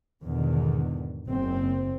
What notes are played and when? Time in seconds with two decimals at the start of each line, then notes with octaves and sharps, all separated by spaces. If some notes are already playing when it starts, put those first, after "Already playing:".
0.23 E2 G#2 B2 D3 D#3
1.27 F#1 C4